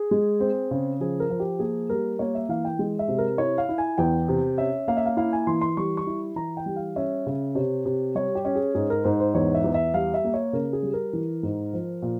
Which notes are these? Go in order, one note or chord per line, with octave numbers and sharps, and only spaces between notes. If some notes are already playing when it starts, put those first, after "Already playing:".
Already playing: G#4
G#3
C4
C#3
F3 G#4
A#4
F3
G4
A#3 G#4
G3 A#4
A#3 C#5
E5
E3 F5
G5
G#3
E5
C3
A#4
E4 C#5
F5
E4
G#5
E2 G5
C3
C#4 E5
A#3 F5
E5
F5
E4 F5
G#5
E3 C6
C6
G3 C#6
C#6
E4
E3 A#5
G5
G3
F5
C#4 E5
C#3
C3 C#5
C3
G3 C#5
G4
C#4
G#4
G#2 G#4
A#4
G#2 C5
C5
E2 C#5
E5
E2
E5
G3 F5
E5
A#3
C#5
C#3 A#4
G#4
G3
A#4
E3
G#2
F3
A#2